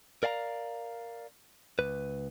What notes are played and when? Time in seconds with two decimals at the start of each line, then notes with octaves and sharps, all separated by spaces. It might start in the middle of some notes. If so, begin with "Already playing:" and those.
0.23 A#4 D5 F5 G#5 A#5
1.79 C#2 B4